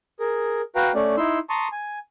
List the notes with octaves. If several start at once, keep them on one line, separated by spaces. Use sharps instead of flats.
G#4 A#4
F#4 B4 F5 G5 A#5
A3 C#4 D5
D#4 E4 C6 E6
A5 A#5 C6 C#6 D#6
G#5